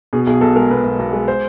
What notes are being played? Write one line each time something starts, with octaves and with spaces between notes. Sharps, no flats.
B2 G#4
B1 G#4
B1 A4
G#3 A#4
B2 B4
B1
B1
G#3
C5